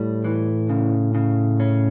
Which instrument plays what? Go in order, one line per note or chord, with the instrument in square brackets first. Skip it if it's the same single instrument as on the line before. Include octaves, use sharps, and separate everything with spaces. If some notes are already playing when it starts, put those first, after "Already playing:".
Already playing: [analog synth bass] A2 [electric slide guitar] G3
[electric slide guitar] E3
C#3
C#3
C#4